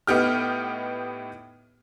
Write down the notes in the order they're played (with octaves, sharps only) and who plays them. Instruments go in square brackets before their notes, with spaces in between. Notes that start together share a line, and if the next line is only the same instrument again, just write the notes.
[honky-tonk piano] A2 B3 D#4 G4 F6